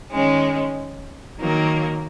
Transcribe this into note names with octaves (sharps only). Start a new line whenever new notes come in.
D#3 G#3 C#4
D#3 F#3 A#3